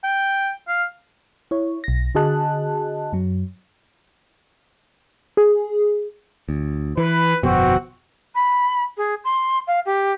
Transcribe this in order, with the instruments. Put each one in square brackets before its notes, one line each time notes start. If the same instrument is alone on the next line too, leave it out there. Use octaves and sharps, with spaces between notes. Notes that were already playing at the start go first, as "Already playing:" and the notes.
[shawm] G5
F5
[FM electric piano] E4 C#5
B1 A#6
D3 F#4 G#4 D#5 A5 F#6
F#2 F#3
G#4
[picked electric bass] D2
[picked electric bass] E3 [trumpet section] B4
[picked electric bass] G1 F2 B2 [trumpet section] C4 F#4
[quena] B5
G#4
C6
F5
G4